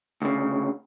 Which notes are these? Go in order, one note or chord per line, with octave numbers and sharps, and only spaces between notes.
D2 C#3